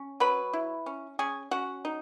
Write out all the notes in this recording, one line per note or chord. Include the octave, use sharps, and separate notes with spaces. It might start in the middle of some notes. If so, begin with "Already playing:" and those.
Already playing: C#4
F#3 B4 B5
E4
C#4
C#4 G#4 G#5
C#4 F#4 F#5
D#4